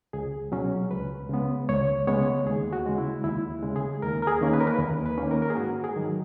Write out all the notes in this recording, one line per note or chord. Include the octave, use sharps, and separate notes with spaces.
C#2 G#4
B2 F#3 C#4
C#2 B4
C#3 G#3 B3
C#2 C#5
C#3 G#3 B3 C#5
D#2 G#4
F#4
C#3 G#3
E4
D#2 E4
C#3 G#3
G#4
D#2 A#4
A#4
G#4
D#3 A#3 C#4
B4
A#4
B4
D#2
B4
D#3 A#3 C#4
A#4
A#4
G#4
G#2 F#4
G#4
D#3 F#3